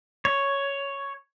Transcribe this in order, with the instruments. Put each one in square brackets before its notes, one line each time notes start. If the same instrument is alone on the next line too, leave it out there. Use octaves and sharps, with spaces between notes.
[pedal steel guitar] C#5